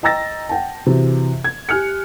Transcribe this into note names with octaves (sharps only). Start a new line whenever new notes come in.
D#5 G5 A#5 E6 A6 A#6
F#5 G5 A5
C3 E3 F#4
G#6
G4 G#5 F6 F#6 C#7